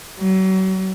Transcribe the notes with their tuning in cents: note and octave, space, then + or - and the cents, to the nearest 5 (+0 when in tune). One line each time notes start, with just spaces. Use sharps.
F#3 +35